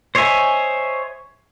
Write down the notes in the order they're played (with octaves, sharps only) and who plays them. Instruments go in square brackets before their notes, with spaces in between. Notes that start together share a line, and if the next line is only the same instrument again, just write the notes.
[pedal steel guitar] C5 C#5 D#5 E5 G#5